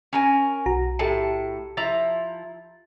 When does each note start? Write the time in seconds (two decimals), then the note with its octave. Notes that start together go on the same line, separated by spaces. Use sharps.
0.13 C#4 A#4 G#5
0.66 B1 F#4 A#5
0.99 A2 G4 A4 A5 C#7
1.77 F3 E4 A#5 A6